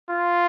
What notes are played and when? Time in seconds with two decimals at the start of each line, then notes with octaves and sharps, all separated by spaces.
0.10 F4